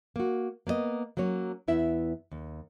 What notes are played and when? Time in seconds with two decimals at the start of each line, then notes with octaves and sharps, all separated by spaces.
0.16 A#3 F#4
0.67 A#3 B3 B4 D#5
1.17 F#3 A#3 C#4 C#5
1.68 E2 B3 E4 E5
2.32 D#2